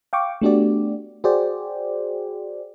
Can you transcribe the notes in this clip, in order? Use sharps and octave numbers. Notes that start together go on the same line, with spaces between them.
F5 G5 C#6 D6
A3 B3 D4 F#4 G4 D5
F#4 G#4 C5 D5 G5